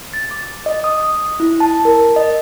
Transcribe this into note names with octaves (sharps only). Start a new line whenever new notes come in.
A6
D6
D#5
D#6
E4
A5
A#4
D#5